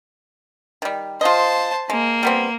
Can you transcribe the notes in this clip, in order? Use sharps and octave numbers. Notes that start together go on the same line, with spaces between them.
D#3 G3
F4 C5 D#5 A5
G#3 A#3
G3 B3 C4